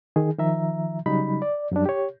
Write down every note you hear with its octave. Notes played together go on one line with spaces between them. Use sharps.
D#3 G#4
D#3 F3 E5 A#5
C#3 F#3 G3 D#4 B5
D5
F#2 F#3 G3 D4
G4 C#5